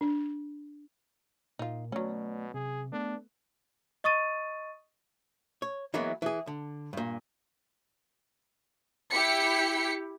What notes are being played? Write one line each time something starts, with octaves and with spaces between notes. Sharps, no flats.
D4
A#2 D#4 F4
B2 F#3 A3 C#4 D5
C3 G#4
A3 B3 D4
D#5 C#6 D#6 A6 D#7
C#5
E3 F#3 G#3 A#3 B3 E4
E3 G#4
D3
G2 A#2
E4 G4 B6 C#7